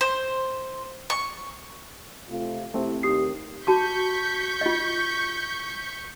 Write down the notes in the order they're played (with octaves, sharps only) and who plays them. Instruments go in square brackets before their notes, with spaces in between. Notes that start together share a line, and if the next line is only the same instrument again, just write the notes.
[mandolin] C5
C#6
[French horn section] C3 A3 F4
[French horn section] C3 E4 [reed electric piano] A3 C4
[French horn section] D#2 [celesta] G4 D#6 C7
[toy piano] F#4 A5 D6 [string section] C#6 G6 B6
[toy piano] F4 D#5